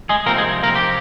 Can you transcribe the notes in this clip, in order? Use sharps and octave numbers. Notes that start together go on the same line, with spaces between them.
G#3 G#4
C3 F3 A#3 C4 D#4 A#4
G#3 G#4
A#3 A#4
G4